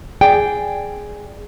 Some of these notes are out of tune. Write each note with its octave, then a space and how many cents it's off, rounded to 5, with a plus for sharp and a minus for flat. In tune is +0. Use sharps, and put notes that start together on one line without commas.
G#4 +0 D5 +0 G5 +0